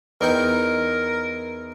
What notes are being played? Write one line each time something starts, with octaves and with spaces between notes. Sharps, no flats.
E2 D#4 A#4 G5